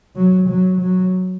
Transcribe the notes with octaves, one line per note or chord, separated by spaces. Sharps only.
F#3
F#3
F#3